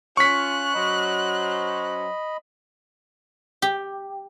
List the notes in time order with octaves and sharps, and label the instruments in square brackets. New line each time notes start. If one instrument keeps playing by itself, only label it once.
[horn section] C#4 F4 [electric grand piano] C#6 B6 [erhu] F#6
[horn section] F#3 C#4 C5 [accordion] D#5 B5
[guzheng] G4